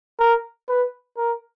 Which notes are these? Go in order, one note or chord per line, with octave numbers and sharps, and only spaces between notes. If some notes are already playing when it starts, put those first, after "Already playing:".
A#4
B4
A#4